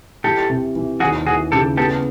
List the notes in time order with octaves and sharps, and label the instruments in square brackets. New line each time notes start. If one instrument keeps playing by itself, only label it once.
[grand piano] E3 [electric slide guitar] G4 A4
[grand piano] C3
E3
[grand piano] D#2 [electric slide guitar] F#4 G#4
[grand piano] E3 [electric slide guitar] F#4 G#4
[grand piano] C#3 [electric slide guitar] G4 A4
[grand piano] B3 [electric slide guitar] G4 A4